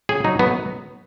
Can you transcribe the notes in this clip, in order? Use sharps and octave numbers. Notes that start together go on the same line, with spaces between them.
C#3 G#4
F#3 D#4
F#3 B3